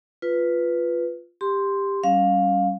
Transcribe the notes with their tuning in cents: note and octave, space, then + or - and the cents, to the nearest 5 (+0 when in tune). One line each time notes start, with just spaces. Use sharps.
F4 +0 B4 +0
G4 +15 C6 +0
G3 -20 C#4 +0 F5 +10